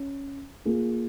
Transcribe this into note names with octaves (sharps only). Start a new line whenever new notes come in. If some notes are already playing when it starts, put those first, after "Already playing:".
Already playing: C#4
A#3 F4 G#4